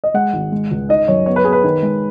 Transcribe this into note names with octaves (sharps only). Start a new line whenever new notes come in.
D#5
G#3 F#5
G#1
G#3
C#2
D#4 D#5
F#2 C#5
B3 C#5
B4
B3 G#4
B4
D#3
G#3